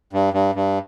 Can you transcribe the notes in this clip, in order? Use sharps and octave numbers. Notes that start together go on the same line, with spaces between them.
G2
G2
G2